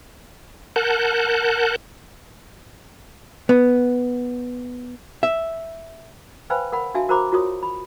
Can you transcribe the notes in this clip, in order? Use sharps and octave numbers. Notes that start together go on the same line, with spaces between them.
A#4 F#5 A5 F#6 G6
B3
E5
B4 C5 F5 G5 G#5 B5
A#4 F#5 B5
D4 F#4 E5 F5 G#5 A5
F#4 A#4 C5 A#5 B5 D6
F4 F#4 A#4 C#5 D#6
B5